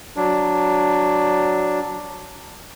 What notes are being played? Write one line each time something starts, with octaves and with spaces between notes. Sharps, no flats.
F#3 D4